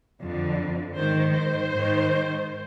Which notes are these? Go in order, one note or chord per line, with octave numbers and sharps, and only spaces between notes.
F2 D3
G#2 D#3 C5
C5
G#2 D#3